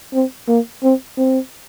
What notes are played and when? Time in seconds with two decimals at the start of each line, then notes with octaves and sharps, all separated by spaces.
0.13 C4
0.48 A#3
0.83 C4
1.18 C4